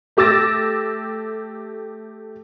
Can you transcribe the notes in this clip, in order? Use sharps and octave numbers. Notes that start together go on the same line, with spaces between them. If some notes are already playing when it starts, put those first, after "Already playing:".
A3 G4 D6 E6 A6 A#6